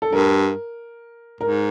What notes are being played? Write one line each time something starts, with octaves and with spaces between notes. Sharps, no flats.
A4
G2 A#4
G#2 A#4